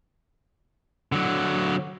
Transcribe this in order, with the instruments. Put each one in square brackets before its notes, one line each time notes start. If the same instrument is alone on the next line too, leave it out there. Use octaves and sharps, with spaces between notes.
[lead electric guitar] D3 F#3